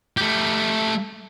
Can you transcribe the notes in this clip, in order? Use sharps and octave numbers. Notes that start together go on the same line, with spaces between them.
A3 G4